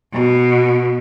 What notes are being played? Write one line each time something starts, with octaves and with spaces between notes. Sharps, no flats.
B2